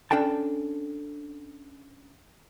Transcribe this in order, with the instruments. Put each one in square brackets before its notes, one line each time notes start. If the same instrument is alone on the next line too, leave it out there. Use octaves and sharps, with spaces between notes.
[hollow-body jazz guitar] C#4 D4 A4 G5 A5